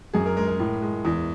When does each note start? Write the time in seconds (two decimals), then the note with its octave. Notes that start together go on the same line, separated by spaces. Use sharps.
0.14 F#2 G#4
0.26 A#4
0.37 G#3 A#4
0.48 A#4
0.59 A2
0.82 G#3
1.05 E2